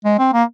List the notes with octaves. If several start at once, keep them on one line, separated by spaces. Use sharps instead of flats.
G#3
C4
A#3